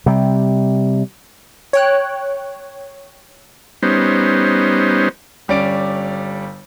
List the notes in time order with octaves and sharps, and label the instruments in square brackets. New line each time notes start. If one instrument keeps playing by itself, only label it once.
[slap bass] C3 G3
[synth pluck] C#5 G5 F#6
[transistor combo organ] G3 B3 C#4 D#4 C5
[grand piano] G1 G3 C#4 D5 D7